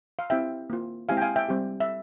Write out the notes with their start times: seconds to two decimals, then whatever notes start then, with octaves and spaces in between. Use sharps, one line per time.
0.19 F5
0.30 C4 E4 G4 E5 G5
0.70 A#3 F4
1.09 G#3 C4 E4 G4 F5 G#5
1.17 G5
1.22 F5 G#5
1.36 E5 G5
1.49 G3 C4 G4
1.80 E5